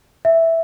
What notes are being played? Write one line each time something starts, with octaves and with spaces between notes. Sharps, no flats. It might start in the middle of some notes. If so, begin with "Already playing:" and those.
E5